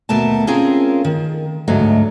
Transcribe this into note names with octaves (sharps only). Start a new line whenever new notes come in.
D#2 B2 A3 A#4 A5
C4 C#4 F4 G#4 A#4
D#3
D2 G#2 F#3 A3 D#5